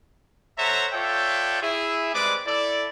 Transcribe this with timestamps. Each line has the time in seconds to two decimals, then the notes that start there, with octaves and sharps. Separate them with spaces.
0.58 A4 C5 C#5 E5 F#5 A#5
0.93 F4 A4 C#5 D5 E5 G5
1.62 E4 G#4 E5
2.14 G3 G#3 C4 B4 D5 D6
2.46 E4 A4 D5